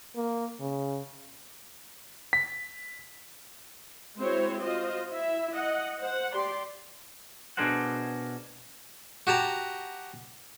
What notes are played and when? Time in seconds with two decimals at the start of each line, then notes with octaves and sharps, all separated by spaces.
0.16 A#3
0.60 C#3
2.33 B6
4.17 G#3 C4 E4 F#4 C5 C#5
4.62 F4 F#4 C5 D#5
5.10 E4 E5
5.55 D#5 F#5
6.01 C5 F#5
6.34 G4 D5 C6
7.57 B2 D4 G#4 A#4 C5 F#5
9.27 F#4 G4 A5 A#5